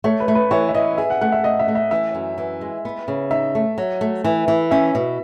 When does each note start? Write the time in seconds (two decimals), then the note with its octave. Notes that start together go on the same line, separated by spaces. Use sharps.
0.04 A3 C#5
0.20 B4
0.28 A3
0.35 B4
0.51 E3 C#5
0.69 E5
0.74 E3 D#5
0.97 G#4 E5
1.10 F#5
1.21 A3 F#5
1.32 E5
1.44 A3 D#5
1.59 E5
1.68 A3
1.75 E5
1.91 E3 E5
2.15 F#2
2.38 E3
2.61 G#3
2.85 B3
3.08 C#3
3.31 D#4 E5
3.55 A3
3.78 F#3
4.01 A3
4.24 E3
4.48 E3
4.71 C#4 E5
4.95 B2